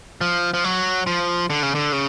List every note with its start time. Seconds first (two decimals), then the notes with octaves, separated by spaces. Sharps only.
0.21 F3
0.54 F3
0.64 F#3
1.07 F3
1.50 D3
1.63 C#3
1.75 D3
1.92 C#3